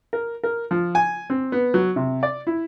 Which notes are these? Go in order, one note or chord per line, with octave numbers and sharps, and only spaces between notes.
A#4
A#4
F3
G#5
C4
B3
F#3
C3
D5
E4